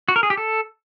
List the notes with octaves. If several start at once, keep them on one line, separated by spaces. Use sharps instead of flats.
F#4
A#4
G#4
G4
A4